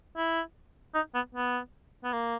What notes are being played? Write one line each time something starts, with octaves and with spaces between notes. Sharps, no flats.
E4
D#4
B3
B3
B3
A#3